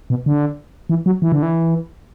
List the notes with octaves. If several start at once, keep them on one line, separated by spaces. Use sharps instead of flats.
B2
D3
E3
F#3
E3
D3
E3